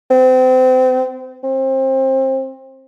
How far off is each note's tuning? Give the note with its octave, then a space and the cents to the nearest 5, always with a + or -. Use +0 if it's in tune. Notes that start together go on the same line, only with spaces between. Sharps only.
C4 -30
C4 +25